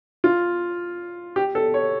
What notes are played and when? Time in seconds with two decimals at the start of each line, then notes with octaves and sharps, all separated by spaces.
0.24 F4
1.36 G4
1.55 A4
1.74 C#5